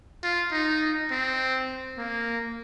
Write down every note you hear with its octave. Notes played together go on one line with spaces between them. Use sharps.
F4
D#4
C4
A#3